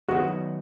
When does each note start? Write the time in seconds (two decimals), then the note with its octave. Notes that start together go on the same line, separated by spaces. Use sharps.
0.08 D#3 F#3 B3 F#4